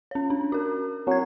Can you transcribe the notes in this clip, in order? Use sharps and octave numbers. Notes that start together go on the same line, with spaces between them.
C#4 C#5
D4
F#4 A#4
F#3 C4 G#6